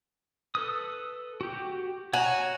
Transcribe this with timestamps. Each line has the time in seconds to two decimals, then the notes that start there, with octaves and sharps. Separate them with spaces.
0.55 A4 B4 D#6
1.41 F#4 G4
2.14 F#4 C#5 G#5 A#5